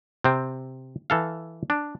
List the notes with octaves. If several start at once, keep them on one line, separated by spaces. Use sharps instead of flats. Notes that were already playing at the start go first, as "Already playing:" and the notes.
C3 C4
E3 A4 F5
D4